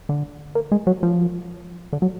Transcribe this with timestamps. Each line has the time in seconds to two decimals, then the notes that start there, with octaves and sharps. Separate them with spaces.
0.09 D3
0.55 A#3
0.72 G#3
0.87 F#3
1.03 F3
1.93 D3
2.02 F#3